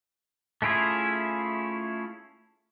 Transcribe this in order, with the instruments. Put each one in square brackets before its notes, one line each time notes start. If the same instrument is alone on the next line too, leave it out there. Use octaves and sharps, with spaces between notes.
[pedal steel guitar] A3 C#4 E4 F4 G#4